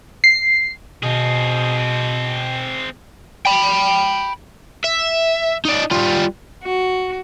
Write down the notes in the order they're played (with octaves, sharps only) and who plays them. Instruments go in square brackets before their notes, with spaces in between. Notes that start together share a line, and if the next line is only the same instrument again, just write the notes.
[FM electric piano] C7
[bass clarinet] B2 [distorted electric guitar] C4 G#4
[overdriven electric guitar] G5 B5
E5
D#4 D5
G3 F4
[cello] F#4